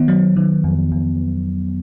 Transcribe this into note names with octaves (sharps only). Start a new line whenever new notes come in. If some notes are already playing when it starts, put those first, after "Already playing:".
Already playing: D#3 B3
F#3
D#3
F2
F2